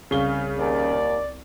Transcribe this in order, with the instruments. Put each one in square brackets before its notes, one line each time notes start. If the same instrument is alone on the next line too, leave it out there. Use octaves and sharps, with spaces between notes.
[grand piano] C2 C#6 G7 [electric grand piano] C#3 [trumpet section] F5
[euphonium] D#2 [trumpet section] D5